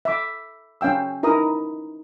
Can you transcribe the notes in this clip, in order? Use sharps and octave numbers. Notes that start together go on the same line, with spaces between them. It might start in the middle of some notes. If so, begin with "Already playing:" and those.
E5 D6
C#4 F5 G5 E6
D#4 E4 A#4 A#5 D#6